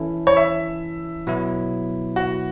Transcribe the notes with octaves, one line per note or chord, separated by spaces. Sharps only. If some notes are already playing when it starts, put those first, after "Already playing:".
Already playing: E3 C#4 E4 A4
C#5
E5
B2 F#3 B3 E4
F#4